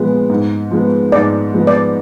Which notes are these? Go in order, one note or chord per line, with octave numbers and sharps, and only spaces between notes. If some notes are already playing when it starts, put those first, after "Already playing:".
Already playing: A#2 F3 G#3 B3
G#2
F3 G#3 B3
G#2 D5
F3 G#3 B3
D5